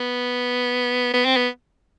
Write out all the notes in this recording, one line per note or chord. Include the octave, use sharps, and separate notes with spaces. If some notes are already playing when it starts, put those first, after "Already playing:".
Already playing: B3
B3
C4
B3